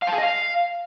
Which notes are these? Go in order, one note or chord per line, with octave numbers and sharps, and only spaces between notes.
F5
A5
G#4
D#5
F5